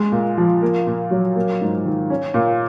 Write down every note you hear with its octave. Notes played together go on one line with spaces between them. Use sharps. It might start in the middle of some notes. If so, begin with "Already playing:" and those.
Already playing: G#3
A#2
F3
A#3
A#2
F#3
A#3
G#2
D#3
C#4
A#2